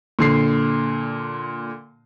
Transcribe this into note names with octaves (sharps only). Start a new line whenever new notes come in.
A#2 D3 C7